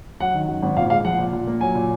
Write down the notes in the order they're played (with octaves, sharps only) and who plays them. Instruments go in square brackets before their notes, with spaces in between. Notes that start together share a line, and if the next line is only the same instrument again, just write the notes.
[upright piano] F#3 F#5
D#3
F#2
G#1
A#2 F5
G#3 F5
F3 F#5
A#2
A#2
A#3
F#3 G#5
A#2